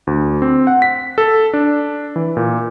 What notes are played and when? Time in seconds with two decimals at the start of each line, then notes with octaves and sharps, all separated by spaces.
0.07 D2
0.42 C4
0.67 F#5
0.82 B6
1.18 A4
1.53 D4
2.16 E3
2.37 A#2